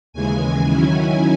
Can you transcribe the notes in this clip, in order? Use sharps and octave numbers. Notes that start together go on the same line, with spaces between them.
D#2 C#3 E3 G#3 G#5
G#5
D#3 F#3 C#4 E4